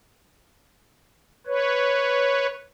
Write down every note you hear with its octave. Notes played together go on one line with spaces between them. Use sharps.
B4 C#5